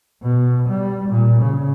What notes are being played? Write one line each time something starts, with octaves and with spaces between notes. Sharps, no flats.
B2
G3
A#2
C#3